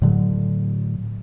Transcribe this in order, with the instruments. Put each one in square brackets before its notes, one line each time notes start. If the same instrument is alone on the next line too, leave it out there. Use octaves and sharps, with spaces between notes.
[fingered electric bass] A2 D3 F#3